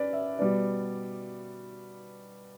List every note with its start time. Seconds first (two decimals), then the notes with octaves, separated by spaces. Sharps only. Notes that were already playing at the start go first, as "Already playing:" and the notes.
Already playing: C#4 B4 D5
0.13 E5
0.39 B2 G3 B3 D5